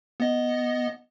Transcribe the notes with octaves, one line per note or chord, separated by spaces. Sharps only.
B3 D#5